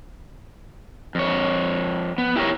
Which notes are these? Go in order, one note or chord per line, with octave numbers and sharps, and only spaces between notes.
F2 C#5
B3
E4 G4 A#4 C#5